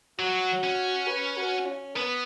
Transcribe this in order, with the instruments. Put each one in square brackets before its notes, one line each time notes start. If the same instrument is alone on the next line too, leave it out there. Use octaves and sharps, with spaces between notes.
[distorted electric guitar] F#3 [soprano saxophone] F#4
[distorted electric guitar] C#4
[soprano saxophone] B4
F#4
C#4
[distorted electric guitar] B3 [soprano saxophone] B4